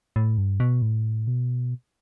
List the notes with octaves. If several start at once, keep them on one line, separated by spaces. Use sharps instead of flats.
A2
G2
B2
A2
B2